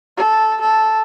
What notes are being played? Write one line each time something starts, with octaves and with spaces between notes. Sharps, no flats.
A4
A4